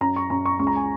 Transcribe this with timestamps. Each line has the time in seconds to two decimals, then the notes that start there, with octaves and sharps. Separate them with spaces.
0.01 F#2 A#5
0.16 C#6
0.30 F#2 A#5
0.46 C#6
0.59 C#2 C#6
0.67 A#5
0.76 G#5